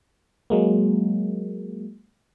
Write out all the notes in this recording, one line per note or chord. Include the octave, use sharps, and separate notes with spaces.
F#3 G#3 A#3